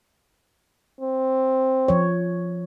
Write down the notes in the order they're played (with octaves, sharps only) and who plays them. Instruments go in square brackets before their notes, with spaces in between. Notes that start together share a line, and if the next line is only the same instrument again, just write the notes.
[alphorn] C4
[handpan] F3 C#5